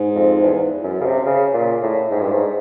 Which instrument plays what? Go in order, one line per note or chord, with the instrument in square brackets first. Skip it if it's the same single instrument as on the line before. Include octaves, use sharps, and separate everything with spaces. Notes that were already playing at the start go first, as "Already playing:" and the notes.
Already playing: [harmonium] G#2
[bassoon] F2
E2
F#2
C#3
C3
C#3
A#2
A2
G#2
G2
G#2